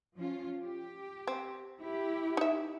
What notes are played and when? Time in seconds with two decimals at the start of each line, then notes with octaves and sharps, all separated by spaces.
0.16 F3 C#4 F4
0.64 G4
1.27 C4
1.79 E4 G4
2.37 D#4 E5